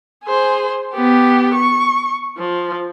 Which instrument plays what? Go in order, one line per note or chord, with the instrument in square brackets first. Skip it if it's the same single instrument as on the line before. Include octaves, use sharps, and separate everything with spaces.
[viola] G#4 C5
B3 G4
C#6
F3